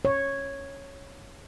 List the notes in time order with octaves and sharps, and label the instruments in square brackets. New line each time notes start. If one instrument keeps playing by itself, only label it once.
[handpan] C#5